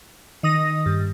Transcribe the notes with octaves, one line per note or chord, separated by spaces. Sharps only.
D#3 D#6 A#6
G2